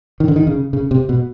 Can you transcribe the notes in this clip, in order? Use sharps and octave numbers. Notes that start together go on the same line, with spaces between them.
D#3
D3
D#3
C#3
C#3
C3
B2